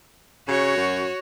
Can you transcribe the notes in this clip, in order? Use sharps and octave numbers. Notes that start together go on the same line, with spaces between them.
C#3 F#4 C#5
F#2